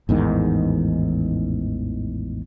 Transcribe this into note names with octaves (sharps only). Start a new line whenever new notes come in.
A1 E2 G#2 D#3